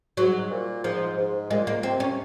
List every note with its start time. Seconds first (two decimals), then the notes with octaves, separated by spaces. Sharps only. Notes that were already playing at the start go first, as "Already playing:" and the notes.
0.17 G#2 F#3
0.51 A#2
0.84 G#2 F3
1.17 G#2
1.51 A#2 G#3
1.67 A#3
1.83 C3 C4
2.00 C#4